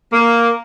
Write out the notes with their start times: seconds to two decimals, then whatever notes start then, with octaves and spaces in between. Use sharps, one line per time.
0.13 A#3